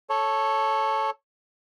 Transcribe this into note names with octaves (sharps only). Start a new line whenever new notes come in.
A4 C#5